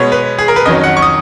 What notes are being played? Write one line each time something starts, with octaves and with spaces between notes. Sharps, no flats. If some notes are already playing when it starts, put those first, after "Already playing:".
Already playing: B2 G#3 B3 C#5
B4
G#4
A#4
B4
F2 D#3 F#3 C#4 D#5
F#5
C#6
D#6